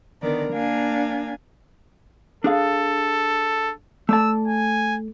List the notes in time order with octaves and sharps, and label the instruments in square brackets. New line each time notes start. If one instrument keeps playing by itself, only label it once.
[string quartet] D3 D#3 B3 A#4 D5
A#3 D4 F5 G#5
[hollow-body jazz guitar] D4 G#4 F5 [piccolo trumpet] A4
[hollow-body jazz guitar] A3 D5 A5 [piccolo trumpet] E6
[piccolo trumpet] G#5